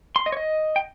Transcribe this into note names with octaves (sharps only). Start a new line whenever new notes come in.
C6
D#5
C#5
D#5
G5